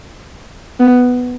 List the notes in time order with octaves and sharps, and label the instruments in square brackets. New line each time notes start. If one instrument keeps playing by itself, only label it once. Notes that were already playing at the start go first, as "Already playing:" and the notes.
[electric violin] B3